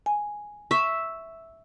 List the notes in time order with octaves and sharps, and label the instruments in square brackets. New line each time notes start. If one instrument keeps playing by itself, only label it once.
[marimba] G#5
[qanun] E5 [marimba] C#6